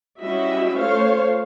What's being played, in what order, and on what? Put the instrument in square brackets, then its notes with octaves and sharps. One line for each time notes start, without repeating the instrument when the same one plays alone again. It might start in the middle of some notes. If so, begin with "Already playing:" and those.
[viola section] G3 C#4 E4 F#4 D#5 E5
A3 F4 C5 C#5 F5